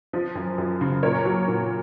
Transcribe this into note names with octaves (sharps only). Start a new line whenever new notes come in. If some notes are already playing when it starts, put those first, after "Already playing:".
F3
F#2
F#2
C#3
A#2 A#4 C#5
F#3
A#2